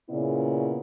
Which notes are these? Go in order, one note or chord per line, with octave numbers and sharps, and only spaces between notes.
A#2 C#3 B3 E4 D5